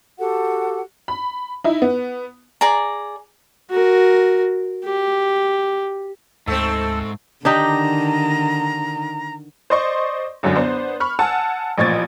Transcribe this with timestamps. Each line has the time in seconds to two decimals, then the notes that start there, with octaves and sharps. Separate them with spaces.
0.19 F#4 G4 A4 F#5
1.08 B5
1.64 D#4 E4
1.82 B3
2.61 G#4 D5 A#5
3.70 F#4 A#4
4.84 G4
6.48 D2 G#2 A3 C4 A4
7.45 D3 D#3 D4 D#4 G4 A#5
9.70 C5 D5 D#5 C6 C#6
10.43 C2 F#2 D3 F#3
10.56 B3 D4 C5
11.00 B5 C#6 F6
11.19 F#5 G#5 A5 E6
11.78 A1 A#2 F3 C#6 G#6 A6